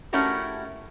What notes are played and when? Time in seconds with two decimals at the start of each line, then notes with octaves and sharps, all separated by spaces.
0.13 A3 C#4 E4 F#4 G4 A#4